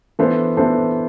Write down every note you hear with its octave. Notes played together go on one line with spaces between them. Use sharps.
E3 B3 D4 A4 C5
E3 B3 D4 A4 C5